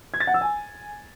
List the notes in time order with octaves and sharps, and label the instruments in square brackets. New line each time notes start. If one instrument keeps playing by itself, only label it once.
[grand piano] G#6
A6
F#5
E6
G#5